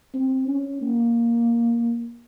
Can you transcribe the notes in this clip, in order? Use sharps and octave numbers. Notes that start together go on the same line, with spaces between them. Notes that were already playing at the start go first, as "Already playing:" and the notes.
C4
C#4
A#3